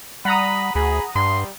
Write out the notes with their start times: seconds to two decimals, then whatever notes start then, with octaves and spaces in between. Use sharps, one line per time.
0.25 G3 F#5 A#5 B5 D#6
0.75 D2 G#4 B5
1.15 G2 G3 C6